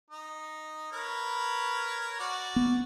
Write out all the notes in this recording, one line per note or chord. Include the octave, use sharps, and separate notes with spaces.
D#4
A#4 B4 C#5
F#4 D5
B3